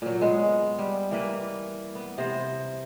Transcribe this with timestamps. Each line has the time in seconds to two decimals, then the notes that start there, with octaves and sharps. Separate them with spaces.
0.02 A#2 F#3
0.21 G#3 B3
0.79 G3
1.11 E3 A#3 B4
1.95 B3
2.18 C3 C5